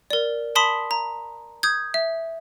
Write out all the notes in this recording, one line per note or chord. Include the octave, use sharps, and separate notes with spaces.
A#4 D5
A5 B5 C6 D#6 B6
A#5
D#6 G6 G#6
E5